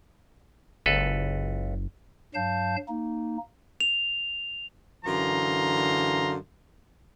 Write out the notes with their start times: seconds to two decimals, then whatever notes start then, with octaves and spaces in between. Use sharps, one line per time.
0.86 F#1 C#2 A4 B4
2.35 G2 F#3 F5 A5 G6
2.89 A#3 D#4
3.80 F7
5.05 F#2 D3 E3 F5 A#5 C6